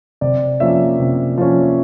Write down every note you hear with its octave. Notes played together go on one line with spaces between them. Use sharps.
C3 D5
F3 A#3 C#4 E5
C3
F3 A#3 C#4